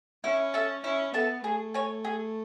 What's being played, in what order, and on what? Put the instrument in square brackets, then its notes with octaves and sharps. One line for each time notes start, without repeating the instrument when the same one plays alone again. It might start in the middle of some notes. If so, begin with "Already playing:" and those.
[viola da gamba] C#4 [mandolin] E4
[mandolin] A4 E5 A5
[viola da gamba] C#4 [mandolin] E4
[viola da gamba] B3 [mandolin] A4 E5 A5
[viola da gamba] A3 [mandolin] G#4
[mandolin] C#5 G#5
G#4